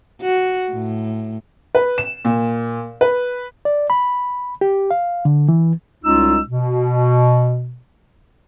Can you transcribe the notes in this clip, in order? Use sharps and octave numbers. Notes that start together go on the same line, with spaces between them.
F#4
A2
B4
E7
A#2
B4
D5
B5
G4
F5
D3
E3
C2 G#3 C#4 D#4 F4 E6
B2